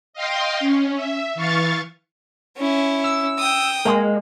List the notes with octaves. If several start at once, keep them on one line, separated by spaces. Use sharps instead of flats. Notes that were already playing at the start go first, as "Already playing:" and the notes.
D#5 F5 G5 C6
C#4
E5
E3 F5 C#6 A6
C#4 E4
E6
G5 D#6
G#3 A#3